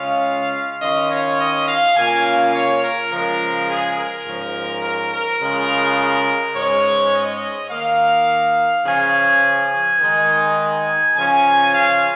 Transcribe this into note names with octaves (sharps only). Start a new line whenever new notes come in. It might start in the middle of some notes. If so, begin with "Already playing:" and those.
Already playing: C#3 G#3 C#4 F4 F5
D#3 C#4 F4 D#5
C#5
D#5
F5
C#3 A#3 C#4 F4 G#5
F5
C#5
A#4
C#3 F3 G#3 F4 A#4
G#4
A#4
G#2 F3 C#4
A#4
A#4
C#3 G#3 F4
G#2 G#3 C#4 C#5
D#5
D#3 A#3 D#4 F5
C#3 F3 C#4 G#5
D#3 G#3 D#4
C#3 F3 C#4 F4 G#5
F5